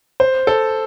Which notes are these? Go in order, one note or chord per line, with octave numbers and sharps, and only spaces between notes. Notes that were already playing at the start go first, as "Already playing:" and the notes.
C5
A4